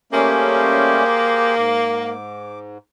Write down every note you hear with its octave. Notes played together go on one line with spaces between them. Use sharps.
G3 A3 A#3 C#4 G4 G#4 C5
G#2 D6